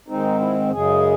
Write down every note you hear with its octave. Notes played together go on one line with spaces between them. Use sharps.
G#2 D#3 G#3 C4 D#4
E4
F#2 C#3 G#3 G#4